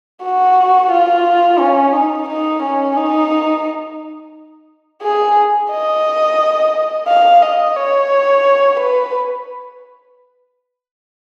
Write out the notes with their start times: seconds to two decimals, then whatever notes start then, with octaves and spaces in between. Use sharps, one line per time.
0.23 F#4
0.92 F4
1.59 C#4
1.93 D#4
2.29 D#4
2.63 C#4
2.97 D#4
5.03 G#4
5.70 D#5
7.08 F5
7.43 D#5
7.76 C#5
8.79 B4